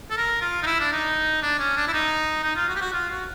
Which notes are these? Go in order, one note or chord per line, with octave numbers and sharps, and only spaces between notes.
A4
A#4
F4
D#4
E4
D4
D#4
D4
C#4
D4
E4
D#4
D#4
F4
F#4
G4
F#4
F4
F#4